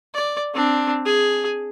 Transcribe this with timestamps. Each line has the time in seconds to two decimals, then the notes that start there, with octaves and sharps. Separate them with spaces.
0.15 D5
0.54 C4 D4
1.05 G#4